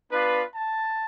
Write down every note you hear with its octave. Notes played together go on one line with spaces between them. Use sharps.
B3 D4 F4 B4
A5